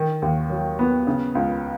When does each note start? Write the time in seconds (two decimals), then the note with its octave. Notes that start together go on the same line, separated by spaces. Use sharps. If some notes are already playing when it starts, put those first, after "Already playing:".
Already playing: D#3
0.22 D#2
0.50 F#3
0.79 B3
1.07 C#3
1.35 C#2